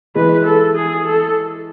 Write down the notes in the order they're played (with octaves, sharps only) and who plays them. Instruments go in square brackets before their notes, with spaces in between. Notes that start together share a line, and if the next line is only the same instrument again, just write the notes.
[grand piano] E3 G#3 [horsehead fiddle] B4
[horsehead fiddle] A4
G#4
A4